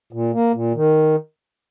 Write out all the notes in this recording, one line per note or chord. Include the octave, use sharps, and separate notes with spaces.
A#2
A#3
A#2
D#3